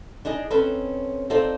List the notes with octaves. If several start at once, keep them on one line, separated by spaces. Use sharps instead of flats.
D4 D#4 G#4 D#5
C4 C#4 D#4 A4 B4
C4 D#4 F4 A4 C5 D5